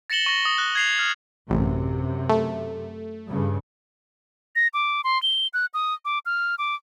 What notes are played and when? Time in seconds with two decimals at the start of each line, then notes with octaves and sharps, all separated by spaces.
0.10 A6 A#6 C#7 E7 F#7 G7
0.26 C#6 A#6
0.45 D#6
0.58 F#6
0.75 G#6 C7 F7
0.99 F6
1.50 A1 F#2 C3
2.29 A3
3.29 G2 C#3
4.56 A#6
4.74 D6
5.04 C6
5.23 G7
5.54 F#6
5.74 D#6
6.05 D6
6.26 F6
6.58 D6